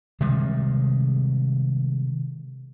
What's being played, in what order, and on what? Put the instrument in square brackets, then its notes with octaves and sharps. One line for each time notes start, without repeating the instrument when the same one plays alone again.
[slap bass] C3 D#3 G3 G#3